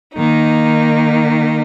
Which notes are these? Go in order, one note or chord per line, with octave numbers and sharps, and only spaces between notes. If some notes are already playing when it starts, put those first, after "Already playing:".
D#3 A#3 D#4